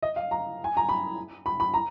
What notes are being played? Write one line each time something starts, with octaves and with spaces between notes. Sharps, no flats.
D#5
F5
A#5
G#5
A#5
B5
B5
B5
A#5